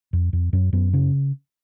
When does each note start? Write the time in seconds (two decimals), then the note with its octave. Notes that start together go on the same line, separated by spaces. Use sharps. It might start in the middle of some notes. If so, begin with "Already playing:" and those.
0.13 F2
0.33 F2
0.53 F#2 C#4
0.73 F#2 B3
0.93 C#3 C#4